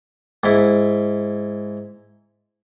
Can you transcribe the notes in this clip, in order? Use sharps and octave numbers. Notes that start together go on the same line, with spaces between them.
G#2 E4